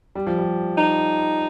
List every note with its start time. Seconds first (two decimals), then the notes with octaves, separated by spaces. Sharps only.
0.15 G3
0.27 F3
0.39 G3
0.78 D#4